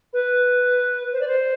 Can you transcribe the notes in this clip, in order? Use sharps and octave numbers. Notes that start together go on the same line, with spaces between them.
B4
C5
D5
C5